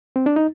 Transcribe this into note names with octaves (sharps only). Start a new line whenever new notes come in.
C4
D4
D#4